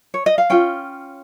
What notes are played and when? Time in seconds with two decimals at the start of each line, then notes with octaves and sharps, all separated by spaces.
0.14 C#5
0.26 D#5
0.38 F5
0.50 C#4 F4 G5